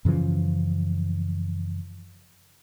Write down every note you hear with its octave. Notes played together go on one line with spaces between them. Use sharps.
F#2 C#3 E3 F3